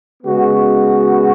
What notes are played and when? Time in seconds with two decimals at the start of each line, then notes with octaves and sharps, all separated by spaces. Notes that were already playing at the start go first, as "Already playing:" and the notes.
0.23 C#3 G#3 B3 F#4